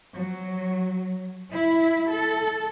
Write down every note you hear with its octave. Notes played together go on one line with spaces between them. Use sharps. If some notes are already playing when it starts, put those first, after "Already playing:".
F#3
E4
A4